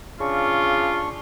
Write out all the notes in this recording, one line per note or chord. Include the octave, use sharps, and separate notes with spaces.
C#3 D4 F4 C#6